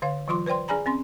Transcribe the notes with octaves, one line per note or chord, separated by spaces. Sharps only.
D3 C#5 F5
E3 F#3 F4 C6 D6
B4 C5 D5 G5 C6
D4 G#4 D5 G#5 A#5 B5
C4 C#4 C6